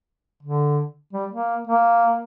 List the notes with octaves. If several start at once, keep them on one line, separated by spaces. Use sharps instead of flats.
D3
G3
A#3
A#3